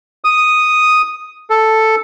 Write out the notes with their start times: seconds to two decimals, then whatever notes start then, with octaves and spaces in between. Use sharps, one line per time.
0.24 D#6
1.50 A4